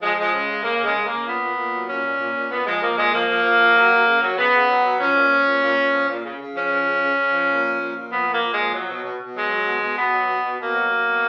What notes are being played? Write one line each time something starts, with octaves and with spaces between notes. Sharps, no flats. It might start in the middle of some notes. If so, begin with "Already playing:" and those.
F3 G#3
F3 G#3
C#3
C#3
C#3 A#3
C#3
G#3
C#3
A#3
C#3
A#2 B3
A#2
A#2
F#3
A#2 C#4
A#2
A#2
A#2
A#2 B3
F3 G#3
F3 A#3
A#2 G#3
F3 A#3
F3
F3
F3
F#3
F#3
C#3
F#3
C#3 B3
C#3
F#3
F#3
F3 C#4
A#2
F3
A#2
A#2
A#2
F3
A#2
C#3
C#3
F3 C#4
F3
C#3
C#3
C#3
F3
A#2
F3
A#2
A#2
F3 B3
A#2 A#3
A#2
F3 G#3
F#3
B2
B2
B2
F#3 G#3
F#3
B2
B2
B2 B3
F#3
B2
B2
B2 A#3
F#3
F#3
B2